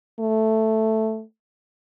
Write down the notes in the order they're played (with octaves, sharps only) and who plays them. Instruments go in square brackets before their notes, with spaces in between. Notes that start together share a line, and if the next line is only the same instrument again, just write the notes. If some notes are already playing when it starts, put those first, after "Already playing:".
[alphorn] A3